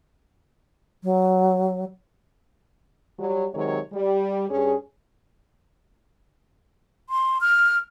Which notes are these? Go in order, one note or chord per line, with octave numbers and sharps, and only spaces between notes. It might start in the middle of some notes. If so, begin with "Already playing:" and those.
F#3
F#3 G3
C3 D#3 F#3 G#3 C#5
G3
G2 C#4 G#4
C6
F6